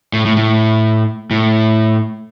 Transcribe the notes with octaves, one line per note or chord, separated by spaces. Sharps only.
A2
A2
A2
A2